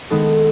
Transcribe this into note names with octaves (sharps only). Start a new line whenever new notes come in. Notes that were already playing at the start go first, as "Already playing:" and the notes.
D#3 G#3 B3 D#4 A4